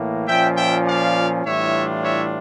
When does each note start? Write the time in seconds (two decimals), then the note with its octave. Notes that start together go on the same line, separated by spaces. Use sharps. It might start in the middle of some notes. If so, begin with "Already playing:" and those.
Already playing: A2 E3 A#3
0.27 A#2 F3 C#4 E5 G5
0.56 E5 G5
0.86 D5 F5
1.44 A2 E3 G3 D4 F4 C#5 E5
2.03 C#5 E5